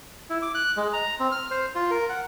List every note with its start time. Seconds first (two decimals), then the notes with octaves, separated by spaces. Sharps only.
0.30 E4
0.42 D6
0.55 F#6
0.77 G#3
0.93 A#5
1.20 C4
1.32 F6
1.51 C5
1.75 F4
1.91 A#4
2.09 F#5